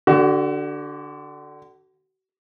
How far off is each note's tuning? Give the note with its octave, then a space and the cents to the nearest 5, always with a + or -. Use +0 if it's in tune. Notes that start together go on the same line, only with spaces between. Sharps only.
D3 +0 F#4 +35